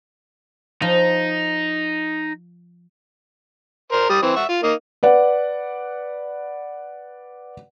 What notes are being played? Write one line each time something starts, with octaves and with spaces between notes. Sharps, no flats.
F3 D#4
A#4 C5
G3 D#6
E3 C4
E5 F#5 C#6
F4
A#3 D#4
B4 D5 F#5